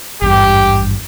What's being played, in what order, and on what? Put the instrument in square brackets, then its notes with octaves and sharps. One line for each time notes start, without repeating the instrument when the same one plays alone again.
[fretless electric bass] G#1 E2 G2 [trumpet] G4